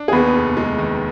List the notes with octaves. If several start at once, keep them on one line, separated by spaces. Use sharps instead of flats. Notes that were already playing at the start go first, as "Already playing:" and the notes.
Already playing: D4
G#4
D#2 B3 B4
F1
G#3
D#3